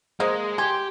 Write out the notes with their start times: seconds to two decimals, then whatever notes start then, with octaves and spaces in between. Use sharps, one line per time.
0.20 G#3 A#3 C5 D#5
0.58 G4 G#5 C6 G#6